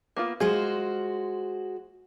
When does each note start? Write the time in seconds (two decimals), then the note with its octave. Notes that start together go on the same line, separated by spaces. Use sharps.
0.16 A#3 B3 F4
0.40 G#3 F4 F#4 G#4 C5